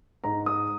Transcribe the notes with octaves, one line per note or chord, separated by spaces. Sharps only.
G#2 A#5
D#6